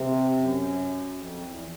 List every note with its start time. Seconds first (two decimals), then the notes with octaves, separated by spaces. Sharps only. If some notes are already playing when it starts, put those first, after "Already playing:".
Already playing: C3
0.36 F#2
1.15 F2
1.41 E2